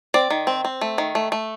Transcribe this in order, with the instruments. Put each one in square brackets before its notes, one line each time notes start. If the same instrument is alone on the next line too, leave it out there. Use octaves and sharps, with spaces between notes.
[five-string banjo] C4 D5
D#3
C4
C4
A3
D#3
A3
A3